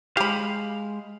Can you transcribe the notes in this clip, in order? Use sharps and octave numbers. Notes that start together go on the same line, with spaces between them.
G#3 G4 F5 B5